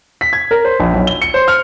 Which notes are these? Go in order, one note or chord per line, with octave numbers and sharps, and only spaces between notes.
B6
G#6
A#4
C5
A#1
B1
G7
C#7
C5
F6